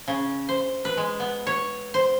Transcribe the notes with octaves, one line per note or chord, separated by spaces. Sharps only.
C#3
C5
B4
G#3
B3
C#5
C5